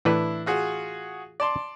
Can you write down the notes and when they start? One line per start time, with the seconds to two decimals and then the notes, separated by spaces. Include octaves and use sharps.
0.05 A2 E3 D4 E4 B4
0.46 F4 F#4 G#4
1.40 D5 A5 C6